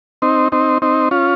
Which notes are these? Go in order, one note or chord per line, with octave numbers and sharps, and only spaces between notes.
C4 D#4
C4 D#4
C4 D#4
C#4 F4